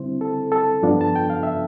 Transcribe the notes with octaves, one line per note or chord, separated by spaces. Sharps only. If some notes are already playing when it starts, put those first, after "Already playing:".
Already playing: D3 G3 C4 E4 C5
A4
A4
G2 F3 B3 D4 F4
A5
G5
F5
E5